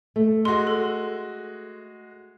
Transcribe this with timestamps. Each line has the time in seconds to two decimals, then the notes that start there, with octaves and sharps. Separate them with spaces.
0.16 A3
0.45 G#3 F#4 C6
0.67 A4